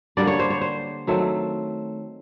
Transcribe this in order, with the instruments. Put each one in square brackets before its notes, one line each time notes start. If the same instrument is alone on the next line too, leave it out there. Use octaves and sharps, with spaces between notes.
[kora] D3 G3 A#3 D5
C#5
C5
C#5
C5
D#3 F#3 A3 C4